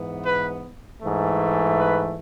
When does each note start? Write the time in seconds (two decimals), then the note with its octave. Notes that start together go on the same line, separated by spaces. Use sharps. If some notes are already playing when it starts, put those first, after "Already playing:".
Already playing: G#2 E3 B3
0.25 B4
1.01 G#2 E3 A3
1.78 B4